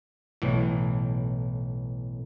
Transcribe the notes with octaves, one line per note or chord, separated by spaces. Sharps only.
B1 A2 E3